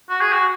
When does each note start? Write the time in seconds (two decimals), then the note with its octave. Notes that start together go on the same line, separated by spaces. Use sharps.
0.09 F#4
0.21 G#4
0.32 F#4